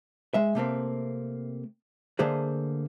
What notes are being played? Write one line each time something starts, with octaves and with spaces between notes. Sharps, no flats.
G#3 E5
C3 A3 A#3 C4
D3 A3 A#3 G#4 C5